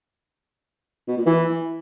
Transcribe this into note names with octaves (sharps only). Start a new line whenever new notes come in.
B2
A#2
E3